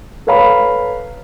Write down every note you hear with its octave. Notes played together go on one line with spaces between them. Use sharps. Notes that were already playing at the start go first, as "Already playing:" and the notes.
A4 B4 C#5 F5 A#5 B5